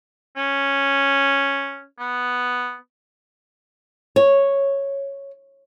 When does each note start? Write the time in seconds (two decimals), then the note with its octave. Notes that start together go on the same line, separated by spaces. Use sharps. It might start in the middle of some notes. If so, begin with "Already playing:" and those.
0.36 C#4
1.99 B3
4.16 C#5